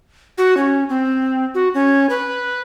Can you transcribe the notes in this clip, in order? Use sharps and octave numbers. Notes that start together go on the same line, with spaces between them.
F#4
C#4
C4
F#4
C#4
B4